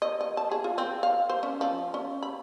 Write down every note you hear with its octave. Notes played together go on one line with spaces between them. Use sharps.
D#5
D#5
A5
G#4
F4
C4
F5
C5
C#4
F3
C#4
B5